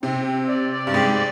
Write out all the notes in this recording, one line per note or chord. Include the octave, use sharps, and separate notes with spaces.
C3 C4
C4
D5
D5
G2
G#2 G4